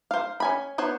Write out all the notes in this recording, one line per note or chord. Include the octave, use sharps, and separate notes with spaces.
C5 F5
C#4 G#5 B5
B3 C5 C#5